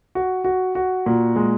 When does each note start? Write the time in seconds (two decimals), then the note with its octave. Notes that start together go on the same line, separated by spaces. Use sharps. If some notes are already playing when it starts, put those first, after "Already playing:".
0.15 F#4
0.44 F#4
0.75 F#4
1.06 A#2
1.36 G#3